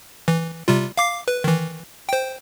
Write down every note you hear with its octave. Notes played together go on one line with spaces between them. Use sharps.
E3
C3 G3 F4
F5 D6 C7
B4
D#3 E3
C5 G5